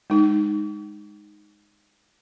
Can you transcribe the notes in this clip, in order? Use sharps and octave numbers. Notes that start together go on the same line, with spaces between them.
G#3 D#4